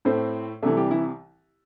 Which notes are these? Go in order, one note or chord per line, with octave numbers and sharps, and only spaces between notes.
A2 A3 C4 C5
C2 C3 E3 A3 A4
G3 G4
E3 E4